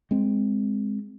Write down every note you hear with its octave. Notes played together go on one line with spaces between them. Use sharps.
G#3 C4